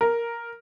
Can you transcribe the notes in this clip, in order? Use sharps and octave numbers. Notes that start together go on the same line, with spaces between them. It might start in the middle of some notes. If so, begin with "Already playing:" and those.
A#4